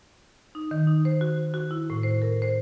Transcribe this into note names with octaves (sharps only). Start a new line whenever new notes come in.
D#4
D#3
D#4
C5
F#4
F#4
E4
A2
C5
A#4
C5